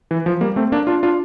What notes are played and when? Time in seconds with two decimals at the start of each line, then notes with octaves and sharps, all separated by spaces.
0.11 E3
0.26 F3
0.41 G3 A#3
0.56 A3 C4
0.72 A#3 D4
0.87 D4 F4
1.03 D4 F4